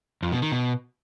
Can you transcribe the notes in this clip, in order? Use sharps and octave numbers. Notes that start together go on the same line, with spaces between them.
F2
B2
D#3
B2